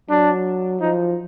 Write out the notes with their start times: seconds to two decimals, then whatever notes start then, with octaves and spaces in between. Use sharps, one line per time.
0.10 F#3 D4
0.81 F3 D#4